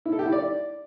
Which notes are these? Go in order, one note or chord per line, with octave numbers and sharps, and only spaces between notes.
E4
A4
G4
E4
D5